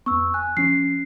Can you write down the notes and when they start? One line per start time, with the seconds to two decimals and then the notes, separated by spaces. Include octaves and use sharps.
0.06 F2 B3 C#6 E6
0.34 G#5 F#6
0.57 F3 C#4 C7